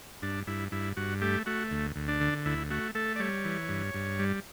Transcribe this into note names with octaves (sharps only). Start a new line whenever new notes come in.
G2 D4
G2 E4
G2 E4
G2 F#4
A3 G4
A3 F#4
D2
D2
D4
D3
D2 E4
A3 F#4
A3 A4
D5
G3 C#5
E3
G2
G2
G3